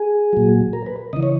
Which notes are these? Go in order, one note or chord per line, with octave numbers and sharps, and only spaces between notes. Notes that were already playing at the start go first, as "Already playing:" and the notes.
Already playing: G#4
A#2 F#3
A#4
B4
C#3 E3 D#5
C#5